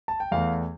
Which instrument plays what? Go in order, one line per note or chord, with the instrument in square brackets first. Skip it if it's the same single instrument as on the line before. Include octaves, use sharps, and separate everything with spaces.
[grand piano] A5
G5
E2 E3 A3 F5